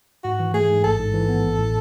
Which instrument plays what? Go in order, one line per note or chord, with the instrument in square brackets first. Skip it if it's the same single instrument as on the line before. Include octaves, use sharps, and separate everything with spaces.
[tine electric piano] G#2 [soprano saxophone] F#4
[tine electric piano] E3
[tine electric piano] A3 [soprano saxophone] G#4
[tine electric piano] G#2
[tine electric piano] A1 [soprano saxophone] A4
[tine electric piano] G#2
E3
B3
A1
A2